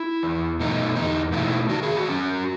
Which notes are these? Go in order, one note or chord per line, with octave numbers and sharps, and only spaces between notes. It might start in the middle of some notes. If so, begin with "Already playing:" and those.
Already playing: E4
E2
B2 A3 D#4
E2 D#4
B2 A3 D#4 E4
D#3 F#4
G#4
F#4
F#3 C#4